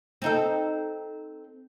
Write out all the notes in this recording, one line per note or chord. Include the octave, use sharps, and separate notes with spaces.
C4 D#4 A4